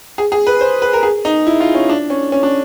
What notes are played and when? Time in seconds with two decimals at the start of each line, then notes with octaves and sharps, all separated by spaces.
0.18 G#4
0.32 G#4
0.47 B4
0.61 C5
0.82 B4
0.93 A#4
1.03 G#4
1.25 D#4
1.47 E4
1.60 F4
1.75 C#4
1.89 D4
2.10 C#4
2.32 C#4
2.43 D4